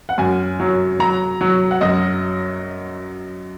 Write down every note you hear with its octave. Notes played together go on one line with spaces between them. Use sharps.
F#5
F#2 G#5
F#3
F#3 A#5
F#3
F#5
F#2 D#5